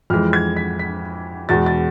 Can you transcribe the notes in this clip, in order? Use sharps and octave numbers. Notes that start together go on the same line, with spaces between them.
F2 E3 G#3 F6
G#6
B6
B6
E2 B2 G#3 A6
A6